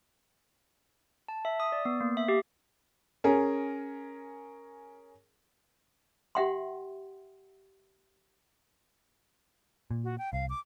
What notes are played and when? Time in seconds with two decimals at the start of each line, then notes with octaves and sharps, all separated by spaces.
1.28 A5
1.45 E5
1.60 D#6
1.72 D5
1.85 B3
2.01 A#3
2.17 E5
2.28 G4
3.24 C#4 G#4 A#4
6.35 G4 E5 F#5 G5 C6
9.91 A#2
10.04 F#4
10.18 G5
10.33 C2 F5
10.50 D6